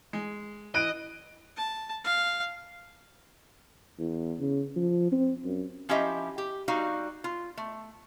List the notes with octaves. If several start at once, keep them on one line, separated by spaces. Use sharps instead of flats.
G#3
E3 D#5 F#6 D7
A5
F5
E2
C#3
F3
C4
F#2
F3 C#4 E4 G4 D#5 E5
G4
G3 D#4 F#4 F5
F4
A3